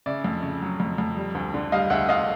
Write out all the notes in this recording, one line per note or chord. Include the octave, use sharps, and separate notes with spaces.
C#3 D5 E5
F2
C#3
F#3
F2
F2
G3
D2
D3
G3 D#5 F5
D2 E5 F#5
D2 D#5 F5